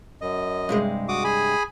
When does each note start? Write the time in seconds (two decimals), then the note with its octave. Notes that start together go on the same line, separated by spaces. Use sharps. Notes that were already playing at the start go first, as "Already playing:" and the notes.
0.21 F#2 D#5
0.69 G2 C3 G#3
1.09 F#4 D6 D#6
1.24 G#4 G#5 B5